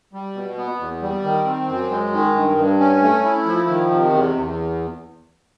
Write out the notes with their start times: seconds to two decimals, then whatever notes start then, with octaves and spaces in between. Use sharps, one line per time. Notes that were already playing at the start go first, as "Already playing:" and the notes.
0.13 G3
0.35 B2
0.58 B3
0.79 E2
1.02 G3
1.24 D#3
1.46 C4
1.68 F#2
1.91 G#3
2.13 D#3
2.35 G2
2.57 G2
2.80 C#4
3.02 A3
3.24 E4
3.46 F3
3.68 D#3
3.90 C3
4.13 E2
4.35 E2